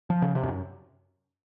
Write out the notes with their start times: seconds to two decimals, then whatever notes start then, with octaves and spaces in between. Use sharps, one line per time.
0.10 F3
0.22 C#3
0.35 C3
0.43 F2
0.47 F#2